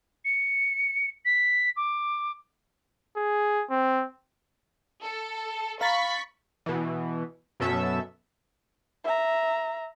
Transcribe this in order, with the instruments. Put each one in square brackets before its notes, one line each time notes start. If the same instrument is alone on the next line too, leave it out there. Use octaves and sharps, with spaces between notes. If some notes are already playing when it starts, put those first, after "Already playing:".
[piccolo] C#7
B6
D6
[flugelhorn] G#4
C4
[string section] A4
[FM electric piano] F5 A#5 A6 [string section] B5 C#6 B6
[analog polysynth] B2 E3
F#2 B2 C#4 A4 E5 E6
[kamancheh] E5 A#5